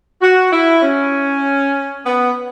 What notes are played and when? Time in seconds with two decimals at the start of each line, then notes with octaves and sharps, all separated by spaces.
0.22 F#4
0.52 E4
0.82 C#4
2.05 B3